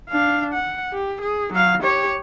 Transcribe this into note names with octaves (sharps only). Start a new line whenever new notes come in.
D4 F5
F#5
G4
G#4
F#3 F5
G4 C#5